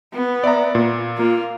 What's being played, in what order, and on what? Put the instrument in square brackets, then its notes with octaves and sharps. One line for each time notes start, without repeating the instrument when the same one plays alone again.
[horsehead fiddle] B3
[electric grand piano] D5 E5 A#5
A#2
[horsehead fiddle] A#3 F4